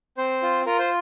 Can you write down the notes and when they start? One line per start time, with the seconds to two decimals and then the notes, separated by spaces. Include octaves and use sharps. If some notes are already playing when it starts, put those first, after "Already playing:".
0.17 C4 C5
0.42 F4
0.66 F4 A#4
0.79 C5